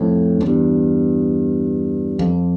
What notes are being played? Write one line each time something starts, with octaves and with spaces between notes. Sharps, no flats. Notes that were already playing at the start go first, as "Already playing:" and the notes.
Already playing: F2 A2
F2
E2 G2
F2